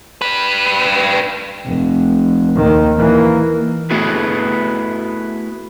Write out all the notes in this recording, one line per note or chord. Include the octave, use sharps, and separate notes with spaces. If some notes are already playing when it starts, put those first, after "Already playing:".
G3 B4
F1
D#2 D#3
E3 A#3
A3 B3 E4 F#4 G#4 B4